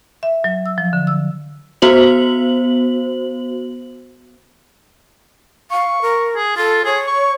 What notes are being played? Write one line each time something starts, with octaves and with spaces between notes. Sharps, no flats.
E5
F#3
E6
F3
D3
E6
B3 F#4 C5 F#7
F5 C#6
A#4
G#4
F4 A4
G#4 C#5
C#6